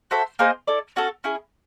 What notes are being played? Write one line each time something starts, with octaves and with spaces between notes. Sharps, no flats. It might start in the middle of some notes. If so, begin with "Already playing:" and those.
F#4 A4 C5 E5
A#3 D#4 G#4 C5
E4 A4 D5
C#4 F#4 A4
C#4 E4 G#4